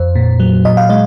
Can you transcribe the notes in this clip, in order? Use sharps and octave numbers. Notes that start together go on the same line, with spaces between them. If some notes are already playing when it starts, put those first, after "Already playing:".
Already playing: F2 C5
A#2
F#3
A#2 D#5
F5
G#3 D#5